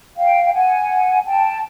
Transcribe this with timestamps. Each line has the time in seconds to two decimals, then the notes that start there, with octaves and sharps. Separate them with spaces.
0.16 F5 G5
0.43 G5
0.52 F#5 G#5
1.25 G5 A5